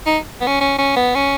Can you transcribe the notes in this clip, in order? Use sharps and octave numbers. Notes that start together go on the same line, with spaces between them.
D#4
B3
C#4
C#4
C#4
B3
C#4